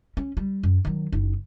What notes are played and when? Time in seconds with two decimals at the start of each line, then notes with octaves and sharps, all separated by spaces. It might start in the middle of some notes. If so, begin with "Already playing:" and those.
0.17 C#4
0.37 G3
0.63 F#2
0.85 D#3 F#3
1.12 F#1 D#4